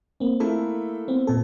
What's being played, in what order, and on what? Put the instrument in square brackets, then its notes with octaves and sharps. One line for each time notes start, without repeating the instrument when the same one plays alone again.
[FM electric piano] A#3 C4
[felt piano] A3 A#3 E4 [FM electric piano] A4
[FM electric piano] B3 C4
A#2 A4